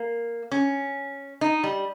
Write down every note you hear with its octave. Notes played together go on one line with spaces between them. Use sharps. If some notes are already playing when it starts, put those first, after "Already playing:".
Already playing: A#3
C#4
D#4
G3